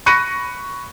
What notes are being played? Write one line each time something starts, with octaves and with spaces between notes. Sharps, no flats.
B5 C#6 F#6 A#6 C#7 D#7